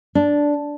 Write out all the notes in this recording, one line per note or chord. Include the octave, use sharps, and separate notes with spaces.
D4